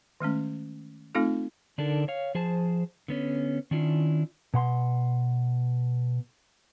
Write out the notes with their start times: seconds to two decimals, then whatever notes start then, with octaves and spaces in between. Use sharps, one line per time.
0.20 D#3 G#3 A3 C#4
1.15 A3 C4 D#4 F4 A4
1.78 D3 D4 D#4 A4 A#4
2.08 C#5 F5
2.35 F3 G#4 C5 A5
3.08 D3 B3 C#4
3.71 D#3 C#4 D4 E4 F4
4.54 B2 F#5 C6